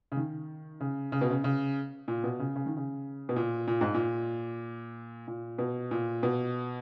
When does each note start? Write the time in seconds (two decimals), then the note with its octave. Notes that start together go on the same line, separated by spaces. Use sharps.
0.12 C#3
0.16 D#3
0.80 C#3
1.12 C#3
1.21 B2
1.31 C#3
1.44 C#3
2.08 A#2
2.24 B2
2.39 C#3
2.56 C#3
2.66 D#3
2.77 C#3
3.29 B2
3.36 A#2
3.67 A#2
3.81 G#2
3.94 A#2
5.28 A#2
5.58 B2
5.91 A#2
6.23 B2